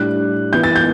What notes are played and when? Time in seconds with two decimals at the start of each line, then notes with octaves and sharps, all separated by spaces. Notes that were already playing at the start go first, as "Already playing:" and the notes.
Already playing: A2 G3 D4 F#6
0.53 E3 B3 E4 G6
0.64 A6
0.76 G6